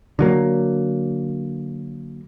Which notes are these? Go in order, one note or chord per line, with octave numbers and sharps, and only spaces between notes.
D3 F#3 A#3